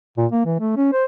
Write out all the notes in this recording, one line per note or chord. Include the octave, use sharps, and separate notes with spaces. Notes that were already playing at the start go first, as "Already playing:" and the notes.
A#2
A#3
E3
A3
C#4
C5